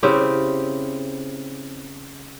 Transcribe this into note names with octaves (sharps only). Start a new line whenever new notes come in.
C#3 C4 E4 G4